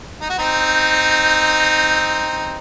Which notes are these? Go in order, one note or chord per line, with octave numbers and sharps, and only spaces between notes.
D#4
F#4
C4 D#4